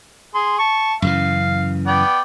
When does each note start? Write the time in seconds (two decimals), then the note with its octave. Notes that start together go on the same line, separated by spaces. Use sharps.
0.35 G#4 C6
0.59 A5 C#6
1.02 F#2 C#3 E3 F5
1.87 B3 D5 G5